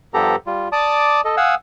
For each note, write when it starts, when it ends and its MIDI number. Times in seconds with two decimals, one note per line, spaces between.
0.14 0.36 43
0.14 0.36 53
0.14 0.36 59
0.14 0.36 67
0.14 0.36 69
0.14 0.36 82
0.47 0.68 55
0.47 0.68 65
0.72 1.21 74
0.72 1.21 81
0.72 1.21 86
0.72 1.21 87
1.25 1.36 69
1.25 1.36 75
1.37 1.55 77
1.37 1.55 78
1.37 1.55 80
1.37 1.55 87
1.37 1.55 88